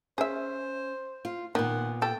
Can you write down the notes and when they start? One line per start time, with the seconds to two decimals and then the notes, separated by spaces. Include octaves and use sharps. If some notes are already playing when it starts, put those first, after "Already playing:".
0.18 C#4 G#4 C5 E5
1.25 F4
1.55 A#2 D#3 B3 F#5
2.02 A4 G5